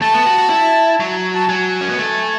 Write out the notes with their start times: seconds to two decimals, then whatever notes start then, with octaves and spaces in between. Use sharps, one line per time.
0.02 A3 A5
0.14 B3
0.26 F#4
0.38 F#4
0.50 E4
1.00 F#3
1.35 A5
1.49 F#3 G#5
1.81 C#4
1.89 B3
1.98 A3